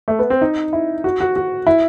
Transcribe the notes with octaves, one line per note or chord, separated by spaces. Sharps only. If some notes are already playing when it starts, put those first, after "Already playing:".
A3
B3
C4
D#4
E4
F#4
F#4
F#4
E4